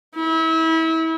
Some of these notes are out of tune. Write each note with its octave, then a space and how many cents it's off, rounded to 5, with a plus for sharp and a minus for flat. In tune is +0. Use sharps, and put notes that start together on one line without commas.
E4 -30